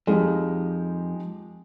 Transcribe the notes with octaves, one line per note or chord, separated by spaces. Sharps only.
F2 G#3 D#4 G4